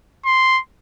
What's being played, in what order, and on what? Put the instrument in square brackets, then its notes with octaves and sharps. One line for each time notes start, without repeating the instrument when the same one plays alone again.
[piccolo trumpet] C6